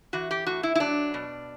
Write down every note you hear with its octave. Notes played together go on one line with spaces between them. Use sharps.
E3 F#4
G4
A2 F#4
E4
E4
F#3 D4
B2